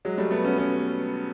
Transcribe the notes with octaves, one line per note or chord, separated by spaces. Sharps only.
F#3 G#3
G3 A3
A3 B3
B3 C#4
B3 C#4